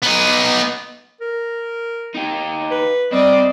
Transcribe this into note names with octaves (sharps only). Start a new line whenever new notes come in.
B3 D#4
A#4
D#4 G4
B4
G3 C4 D5 D#5